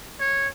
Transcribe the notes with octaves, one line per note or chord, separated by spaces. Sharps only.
C#5